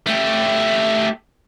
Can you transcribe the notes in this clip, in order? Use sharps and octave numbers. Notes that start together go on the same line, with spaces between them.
A3 G4